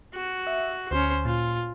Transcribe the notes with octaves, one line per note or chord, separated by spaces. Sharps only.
F#4
E5
D2 C#4 C5
A#2 F4